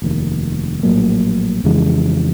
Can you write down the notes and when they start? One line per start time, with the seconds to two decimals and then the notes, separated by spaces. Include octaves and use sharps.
0.02 F1 D#2 D#3
0.83 A#1 A2 F#3 A#3
1.64 F2 C#3 E3 G#3